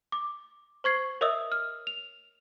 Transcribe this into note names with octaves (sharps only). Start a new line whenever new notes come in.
D6
C5 C#6 G#6 C7
A#4 C#5 D#5 E5 D#6 E6
F6
F7